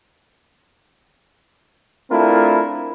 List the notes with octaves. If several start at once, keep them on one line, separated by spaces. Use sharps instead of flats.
A3 C4 D4 E4 F4 A#4